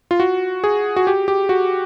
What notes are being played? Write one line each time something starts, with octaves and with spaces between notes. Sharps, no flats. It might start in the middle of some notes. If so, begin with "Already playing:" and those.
F4
F#4
G#4
F#4
G4
G4
F#4